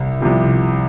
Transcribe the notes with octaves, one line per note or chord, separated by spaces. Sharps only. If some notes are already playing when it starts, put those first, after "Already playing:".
Already playing: C2 C3
C2 C3 F3